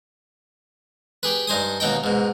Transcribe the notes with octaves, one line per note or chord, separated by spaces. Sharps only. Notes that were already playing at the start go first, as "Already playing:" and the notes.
G4 G#4 B4
G2 D#4 C5 G#5 D#6
D#2 B2 D#4 D#5 G5
G#2 B2